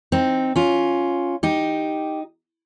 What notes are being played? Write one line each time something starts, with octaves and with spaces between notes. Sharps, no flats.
C4 D#4
C#4 F4
D#4 G4